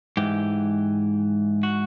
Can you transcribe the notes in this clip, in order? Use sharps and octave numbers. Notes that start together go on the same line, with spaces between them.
G#2 E3 G4
F#4